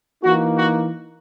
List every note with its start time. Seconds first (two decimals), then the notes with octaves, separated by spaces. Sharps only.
0.23 E3 A#3 D#4 F#4
0.58 F#4